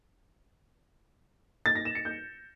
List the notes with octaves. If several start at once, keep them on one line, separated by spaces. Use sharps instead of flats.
A6
A#6
E7
C#7
G6